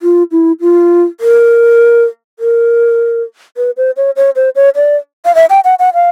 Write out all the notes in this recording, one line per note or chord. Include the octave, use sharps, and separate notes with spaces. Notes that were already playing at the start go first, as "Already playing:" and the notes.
F4
E4
F4
A#4
A#4
B4
C5
C#5
C#5
C5
C#5
D5
F5
E5
G5
F#5
F#5
F5